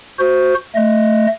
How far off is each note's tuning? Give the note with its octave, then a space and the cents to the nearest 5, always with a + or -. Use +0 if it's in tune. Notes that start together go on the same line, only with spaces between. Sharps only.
F#4 +0 C5 +0
A3 +5 D#5 +0